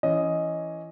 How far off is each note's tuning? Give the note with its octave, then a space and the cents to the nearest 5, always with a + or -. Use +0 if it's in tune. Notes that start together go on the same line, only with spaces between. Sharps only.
E3 +15 C#4 +0 D#5 +0